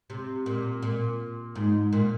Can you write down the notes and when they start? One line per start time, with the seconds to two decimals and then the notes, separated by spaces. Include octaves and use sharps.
0.10 C3
0.46 A#2
0.83 A#2
1.55 G#2
1.93 A#2